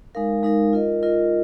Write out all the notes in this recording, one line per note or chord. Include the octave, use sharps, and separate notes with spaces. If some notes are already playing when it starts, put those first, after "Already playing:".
G#3 D#4 A#4 F5
G#3 D#4 A#4 F5
F4 A#4 D#5
F4 A#4 D#5